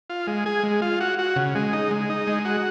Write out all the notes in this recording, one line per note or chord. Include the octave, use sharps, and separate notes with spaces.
F4
G#3
G#4
G#3
F4
F#4
F#4
C#3
G#3
D#4
G#3
D#4
G#3
F#4